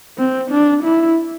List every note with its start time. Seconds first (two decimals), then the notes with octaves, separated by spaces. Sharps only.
0.18 C4
0.50 D4
0.83 E4